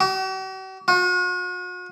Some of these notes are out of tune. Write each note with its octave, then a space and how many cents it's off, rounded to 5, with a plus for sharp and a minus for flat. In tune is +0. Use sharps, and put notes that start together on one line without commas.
F#4 +45
F#4 -45